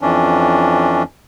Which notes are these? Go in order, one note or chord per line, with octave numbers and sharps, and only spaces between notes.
F2 E3 C#4 D4